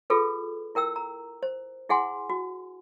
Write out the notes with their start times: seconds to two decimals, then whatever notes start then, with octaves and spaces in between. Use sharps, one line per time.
0.10 F4 G#4 A4 B4
0.75 E4 A#4 G5 E6
0.96 A#5
1.43 C5
1.89 E4 G#4 F#5 G#5 C6
2.30 F#4